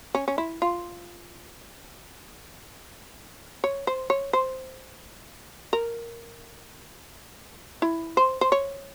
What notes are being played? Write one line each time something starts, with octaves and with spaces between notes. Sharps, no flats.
C#4
C#4
E4
F4
C#5
C5
C#5
C5
A#4
E4
C5
C5
C#5